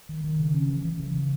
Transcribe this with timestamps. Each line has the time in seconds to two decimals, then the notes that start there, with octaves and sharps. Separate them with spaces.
0.09 D#3
0.24 D#3
0.39 C#3
0.54 C#4
0.69 E3
0.85 E3
0.99 C#3
1.14 C#3